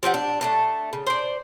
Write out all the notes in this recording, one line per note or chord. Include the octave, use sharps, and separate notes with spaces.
F3 C4 G4 F#5
D4
A3 D4 A5
C#3
C5 D5